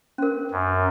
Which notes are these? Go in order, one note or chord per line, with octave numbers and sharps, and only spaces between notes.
C#4 A#4
F#2